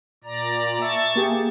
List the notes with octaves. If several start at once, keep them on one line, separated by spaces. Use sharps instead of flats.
A#2 D5 A#5
E5 A5 C#6 A6
A#3 G4 G#4